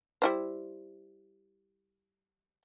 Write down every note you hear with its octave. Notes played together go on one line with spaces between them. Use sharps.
G3 E4 C5